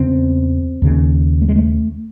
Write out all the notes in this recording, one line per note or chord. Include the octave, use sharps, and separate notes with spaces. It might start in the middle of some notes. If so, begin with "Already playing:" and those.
Already playing: E2 C#3 C4
D#2 C#3
A3
G#3
A3